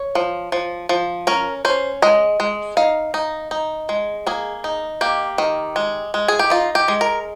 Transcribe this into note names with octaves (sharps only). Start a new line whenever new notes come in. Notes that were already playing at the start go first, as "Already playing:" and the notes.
Already playing: C#5
F3
F3
F3
C#4 A#4
C#4 C5
G#3 D#5
G#3
D#4 F5
D#4
D#4
G#3
A#3 G#4
D#4
A#3 G4
D#3
G#3
G#3
G#4
G4
D#4 F4
G4
G#3
A#4